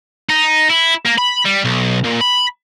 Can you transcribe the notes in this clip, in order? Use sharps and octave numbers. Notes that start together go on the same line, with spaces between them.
D#4
E4
A#3
B5
G3
B1
A#2
B5